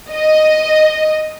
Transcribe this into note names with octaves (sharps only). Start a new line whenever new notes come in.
D#5